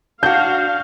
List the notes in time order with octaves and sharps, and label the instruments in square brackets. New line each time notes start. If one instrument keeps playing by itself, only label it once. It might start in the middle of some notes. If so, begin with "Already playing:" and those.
[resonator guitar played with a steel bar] D4 F#4 [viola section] F5 [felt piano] G6